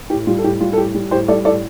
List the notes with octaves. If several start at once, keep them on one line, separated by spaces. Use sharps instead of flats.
A2 G4
G3 F4
A4
A2 G4
G3 F4
A4
A2 G4
G3
A2 G4 C5
G3 A4 D5
A2 A4 D5